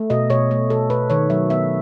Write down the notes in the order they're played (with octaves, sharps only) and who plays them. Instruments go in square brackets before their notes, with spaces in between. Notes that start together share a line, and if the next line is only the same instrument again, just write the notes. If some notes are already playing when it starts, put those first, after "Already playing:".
Already playing: [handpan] A3
B2 D#5
B2 C#5
A3
B2 A4
B2 B4
D#3 C#5
F#3 E5
B3 E5